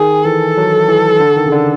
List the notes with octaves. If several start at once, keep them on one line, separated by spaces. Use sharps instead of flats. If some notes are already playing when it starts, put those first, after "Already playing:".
Already playing: D#3 G#4
E3 A4
F#3
E3
D3
D#3
C#3
D3